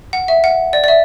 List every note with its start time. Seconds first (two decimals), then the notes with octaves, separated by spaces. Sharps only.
0.13 F#5
0.28 E5
0.44 F#5
0.73 D5
0.84 D5
0.88 E5